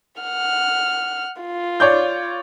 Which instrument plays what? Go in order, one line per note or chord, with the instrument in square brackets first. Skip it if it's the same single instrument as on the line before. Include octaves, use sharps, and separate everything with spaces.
[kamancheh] F#5 F6
F4
[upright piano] C#5 D5 G6